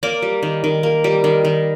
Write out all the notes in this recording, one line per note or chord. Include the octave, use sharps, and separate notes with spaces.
A#3 D5
G3
D#3
D#3
A#3
G3
D#3
D#3